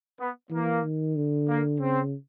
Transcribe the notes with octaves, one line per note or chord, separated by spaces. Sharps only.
B3
E3 A#3
D#3
D3
A#3
C#3 C4